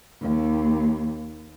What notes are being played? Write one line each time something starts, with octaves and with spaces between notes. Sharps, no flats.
D#2